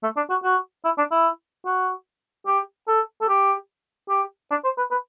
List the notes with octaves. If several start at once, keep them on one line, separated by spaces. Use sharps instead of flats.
A3
D4
F#4
F#4
E4
D4
E4
F#4
G4
A4
A4
G4
G4
D4
C5
B4
B4